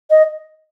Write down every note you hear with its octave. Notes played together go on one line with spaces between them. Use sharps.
D#5